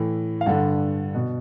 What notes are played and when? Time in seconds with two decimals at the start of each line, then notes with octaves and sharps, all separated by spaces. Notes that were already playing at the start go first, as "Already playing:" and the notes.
Already playing: A2 E3
0.41 F5
0.46 G2 D3 F#5
1.15 B2